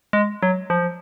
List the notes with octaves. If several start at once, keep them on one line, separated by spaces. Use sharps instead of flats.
G#3
F#3
F3